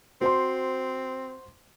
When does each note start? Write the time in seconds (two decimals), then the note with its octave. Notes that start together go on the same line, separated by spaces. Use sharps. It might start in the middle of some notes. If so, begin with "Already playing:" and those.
0.21 C4 F#4 C5 C6